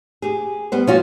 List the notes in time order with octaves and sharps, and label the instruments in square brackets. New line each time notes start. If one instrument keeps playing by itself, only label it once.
[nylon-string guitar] G4 G#4
G3 B3 C5
[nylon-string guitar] F3 [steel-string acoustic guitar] C#4 F4 F#4